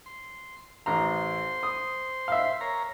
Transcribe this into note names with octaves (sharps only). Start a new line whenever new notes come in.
C6
A1 C5 A#5 C6
D#6
E5 F5
A#4 C#5 A#5